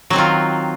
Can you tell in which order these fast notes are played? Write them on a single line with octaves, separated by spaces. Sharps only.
F#3 C4 D#3 F4